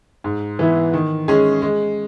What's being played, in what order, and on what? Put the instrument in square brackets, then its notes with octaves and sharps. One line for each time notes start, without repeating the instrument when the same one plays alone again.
[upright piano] G#2
E3 B3 E4
D#3
G#3 C#4 G#4
G#3